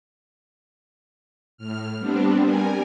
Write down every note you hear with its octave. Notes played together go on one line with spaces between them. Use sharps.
A2 F6
G3 B3 C4 D4
G3 A#4 G#5